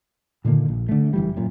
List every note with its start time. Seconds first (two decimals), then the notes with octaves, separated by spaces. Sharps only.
0.44 A#2 D3 D#3 A#3
0.69 A#1
0.89 D3 A3
1.13 F#1 E3 G3
1.37 F#2 A#2